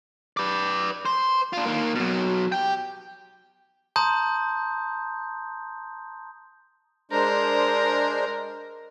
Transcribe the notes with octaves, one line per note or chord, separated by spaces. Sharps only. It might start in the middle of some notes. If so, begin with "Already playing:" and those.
B4 D5
C5
D4 F4
D#3 A#3
B2 F#3
G4 G5
A5 A#5 C6 D#6 G6
G#3 D4 A#4 C5